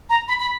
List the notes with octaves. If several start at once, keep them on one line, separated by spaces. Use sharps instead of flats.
A#5
B5
B5